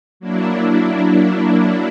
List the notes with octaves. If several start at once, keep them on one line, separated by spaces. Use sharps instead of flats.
F#3 A#3 D4 E4